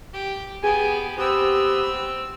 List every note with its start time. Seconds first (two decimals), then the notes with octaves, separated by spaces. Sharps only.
0.14 G4
0.63 B3 G4 G#4 G#5
1.18 B3 C4 G4 E6